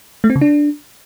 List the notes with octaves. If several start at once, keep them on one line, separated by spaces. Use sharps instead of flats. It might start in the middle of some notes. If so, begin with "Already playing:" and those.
A3
C4
C#3
D4